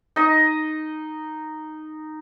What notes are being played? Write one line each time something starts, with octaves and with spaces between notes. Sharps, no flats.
D#4 D#5